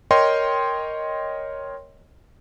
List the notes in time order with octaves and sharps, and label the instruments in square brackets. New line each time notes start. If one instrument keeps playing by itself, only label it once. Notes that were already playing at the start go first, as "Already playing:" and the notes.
[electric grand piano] A#4 C#5 D#5 G5 C6